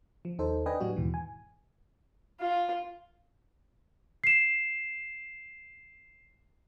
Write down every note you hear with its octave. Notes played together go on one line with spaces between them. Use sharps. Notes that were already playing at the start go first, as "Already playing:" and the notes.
F3
D#2 D#4 A4 C5
D4 B4 D#5 G5 G#5
A2 F#3 G3 D4 F#4
D#2 G#2 B2 E3
G#5
F4
C7 E7